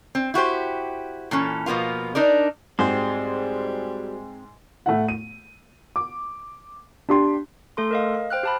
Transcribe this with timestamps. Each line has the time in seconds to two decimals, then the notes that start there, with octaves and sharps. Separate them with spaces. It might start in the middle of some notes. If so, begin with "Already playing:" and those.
0.15 C4
0.34 E4 F#4 G4 C5
1.31 A#2 E3 C#4 A4
1.66 B2 F3 A#3 B3 F4
2.15 D4 D#4 A#4 D5
2.79 G#2 G3 C4 F#4 G#4 C5
4.86 A2 A3 E4 F#5
5.09 D#7
5.96 D6
7.09 D4 G4 C6
7.77 A3 A4 C6
7.91 A#4 D#5 F5
8.14 F5
8.30 C5 G5 F6 F#6
8.43 G4 A5 B5